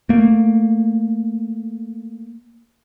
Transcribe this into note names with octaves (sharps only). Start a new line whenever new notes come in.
A3 A#3